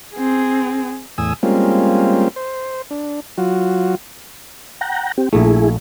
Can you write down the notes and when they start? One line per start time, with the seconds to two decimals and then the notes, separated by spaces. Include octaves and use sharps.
0.16 C4 G#4
1.18 E2 A2 G#5 D#6 E6
1.43 G3 G#3 A#3 C4 C#4 F4
2.36 C5
2.91 D4
3.38 F#3 F4 F#4
4.81 F#5 G5 A#5
5.18 C4 G4
5.33 A#1 A3 E4 G#4